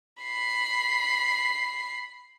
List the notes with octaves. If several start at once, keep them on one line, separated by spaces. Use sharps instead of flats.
B5 C7